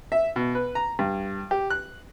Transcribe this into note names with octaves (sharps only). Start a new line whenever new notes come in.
E5
B2
B4
A#5
G2
G4
F#6